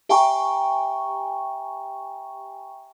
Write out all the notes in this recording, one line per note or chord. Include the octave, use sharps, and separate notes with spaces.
G4 E5 G5 G#5 A#5 C#6